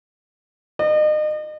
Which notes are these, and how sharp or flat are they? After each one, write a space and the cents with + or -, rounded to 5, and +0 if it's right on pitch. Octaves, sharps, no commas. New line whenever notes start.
D#5 -35